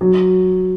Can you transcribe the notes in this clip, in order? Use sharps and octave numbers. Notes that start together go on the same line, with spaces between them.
F#3